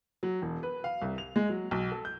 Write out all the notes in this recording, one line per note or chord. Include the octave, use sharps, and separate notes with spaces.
F#3
E1
B4
F5
C2
F7
G#3
F#3
B1
A4
G6